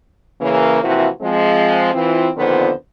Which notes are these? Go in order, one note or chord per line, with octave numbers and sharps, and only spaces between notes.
C#3 E3 A#3
C3 E3 F3 A#3 E4 F#4
F3 G#3 C4
E3 C4 F4
F2 A#2 D3 D#3 B3 C5